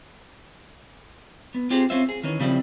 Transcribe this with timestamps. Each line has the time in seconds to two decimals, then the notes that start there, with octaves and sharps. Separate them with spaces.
1.54 B3
1.70 C4 F4 G4 G#4 C5
1.90 C4 C#4 F4 C5 E5
2.09 G#4
2.23 D#3 E3 C#4
2.40 C#3 F3 G3 C4 E4